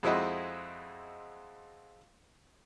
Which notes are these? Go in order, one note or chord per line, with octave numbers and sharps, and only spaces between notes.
F2 G#3 C4 E4 F#4 D#5